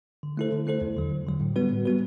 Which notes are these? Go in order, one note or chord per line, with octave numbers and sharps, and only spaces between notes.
D3
A3 E4 A4 C5
D3
A3 E4 A4 C5
E2
D3 F#3
E2
D3 F#3
A2
G3 B3 F#4 B4
A2
G3 B3 F#4 B4